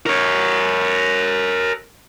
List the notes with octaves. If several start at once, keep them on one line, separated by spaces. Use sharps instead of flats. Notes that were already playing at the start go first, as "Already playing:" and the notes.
A#4 C#5